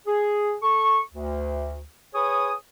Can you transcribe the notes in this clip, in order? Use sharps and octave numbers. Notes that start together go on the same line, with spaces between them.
G#4
A4 C#6
D2
G#4 B4 C#5 D#6